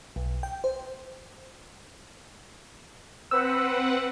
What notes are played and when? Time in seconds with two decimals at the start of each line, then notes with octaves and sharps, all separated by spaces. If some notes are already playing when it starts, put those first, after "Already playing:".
0.16 B1
0.43 G5
0.64 C5
3.31 C4 B4 F#5 E6